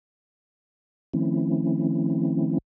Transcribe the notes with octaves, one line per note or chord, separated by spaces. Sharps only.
D#3 F3 A3 C4 C#4 E4